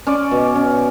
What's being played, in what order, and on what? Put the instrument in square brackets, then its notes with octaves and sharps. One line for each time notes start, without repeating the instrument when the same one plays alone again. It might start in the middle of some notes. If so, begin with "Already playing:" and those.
[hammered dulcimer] C#4 D5
B2
C#4